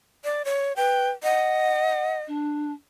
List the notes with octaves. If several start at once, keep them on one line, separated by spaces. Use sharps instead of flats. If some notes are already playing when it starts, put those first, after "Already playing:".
D5
C#5
B4 G5
D#5 F#5
D4